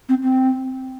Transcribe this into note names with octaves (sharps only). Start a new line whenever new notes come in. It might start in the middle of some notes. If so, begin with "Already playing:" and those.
C4
C4